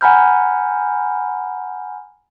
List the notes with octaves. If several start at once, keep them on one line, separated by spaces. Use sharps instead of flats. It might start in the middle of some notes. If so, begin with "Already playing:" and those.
F#5 G#5 A#5 B5 F6 G6